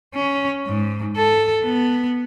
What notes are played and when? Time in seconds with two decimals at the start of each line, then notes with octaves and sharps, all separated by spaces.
0.15 C#4
0.67 G#2
1.17 A4
1.64 B3